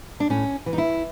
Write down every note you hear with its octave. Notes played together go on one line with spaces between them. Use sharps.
D4
A2 C#4
E3
D#4
E4